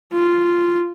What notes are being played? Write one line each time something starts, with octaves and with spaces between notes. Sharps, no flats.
F4